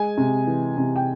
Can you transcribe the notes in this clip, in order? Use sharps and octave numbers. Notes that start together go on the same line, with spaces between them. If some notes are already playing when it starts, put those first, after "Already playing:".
Already playing: G#3 G#5
C3
E3
C3
G5